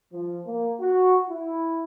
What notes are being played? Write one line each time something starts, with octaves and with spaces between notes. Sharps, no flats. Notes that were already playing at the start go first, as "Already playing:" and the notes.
F3
A#3
F#4
E4